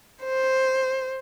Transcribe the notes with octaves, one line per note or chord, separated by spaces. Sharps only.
C5